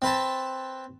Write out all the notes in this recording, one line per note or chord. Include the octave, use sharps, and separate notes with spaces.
C4 B4 A5